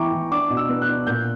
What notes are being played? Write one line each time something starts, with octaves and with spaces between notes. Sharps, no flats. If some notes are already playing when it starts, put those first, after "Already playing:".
Already playing: E3 B3 E4 G5 A#5 C#6 D6
E3
D4 D6
B2
E6
B3
F#6
D4
A#2 G6